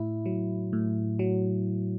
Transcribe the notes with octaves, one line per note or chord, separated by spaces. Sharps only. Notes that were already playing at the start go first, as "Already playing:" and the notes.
Already playing: A2 E4
F#3
A2
F#3